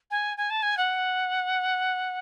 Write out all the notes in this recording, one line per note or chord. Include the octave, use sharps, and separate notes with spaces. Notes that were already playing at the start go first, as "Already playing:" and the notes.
G#5
G#5
A5
G#5
F#5